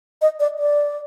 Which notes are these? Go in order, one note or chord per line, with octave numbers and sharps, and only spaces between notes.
D#5
D5
D5